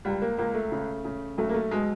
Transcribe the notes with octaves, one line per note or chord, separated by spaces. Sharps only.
C#2 G3
A#3
C#2 A#3
A3
C#3
C#3
B1 A3
A#3
A3
B2 G#3